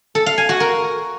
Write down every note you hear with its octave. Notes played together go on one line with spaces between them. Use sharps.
A4
F5
G#5
F#4
A#4